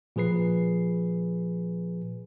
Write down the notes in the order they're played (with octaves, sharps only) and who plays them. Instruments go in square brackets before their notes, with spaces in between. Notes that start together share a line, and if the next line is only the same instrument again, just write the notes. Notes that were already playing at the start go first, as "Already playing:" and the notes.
[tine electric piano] A#2 F3 G#4 B4 C7